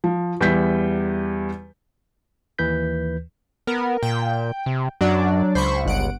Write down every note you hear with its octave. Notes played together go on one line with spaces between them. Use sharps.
F3
E2 G3 E4 G6 B6
D#2 E3 B4 G6 B6
B3 A#4
A#2 G5
C3
F#2 F#3 D4 D5
C#2 C5 B5 C#6
G1 F#5 D7